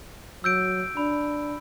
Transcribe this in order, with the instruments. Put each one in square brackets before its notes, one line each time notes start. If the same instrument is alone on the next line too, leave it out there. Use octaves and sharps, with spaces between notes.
[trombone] F#3 [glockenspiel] E6 G6 D7
[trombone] D4 [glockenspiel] B5